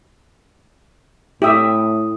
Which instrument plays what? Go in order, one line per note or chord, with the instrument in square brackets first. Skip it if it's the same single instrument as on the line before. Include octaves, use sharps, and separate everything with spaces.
[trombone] A2 [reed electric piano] E4 D#6 [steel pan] G4 E5